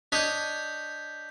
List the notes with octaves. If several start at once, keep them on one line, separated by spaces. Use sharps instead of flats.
D4 C#5 D#5 G6 B6